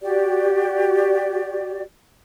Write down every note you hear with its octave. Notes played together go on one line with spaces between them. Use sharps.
F#4 G4 D5